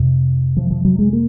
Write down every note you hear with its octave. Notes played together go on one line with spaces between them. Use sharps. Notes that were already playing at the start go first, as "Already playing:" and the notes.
Already playing: F2 C3
F3
F3
F#3
G#3
A#3